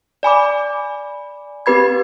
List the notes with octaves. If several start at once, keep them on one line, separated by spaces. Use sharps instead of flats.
D5 G#5 B5 D6
C4 G4 B4 B5 G#6